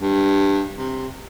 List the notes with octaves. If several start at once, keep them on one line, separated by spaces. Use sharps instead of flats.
G2
C3